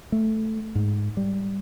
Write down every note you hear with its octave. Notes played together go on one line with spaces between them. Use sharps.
A3
G#2
G3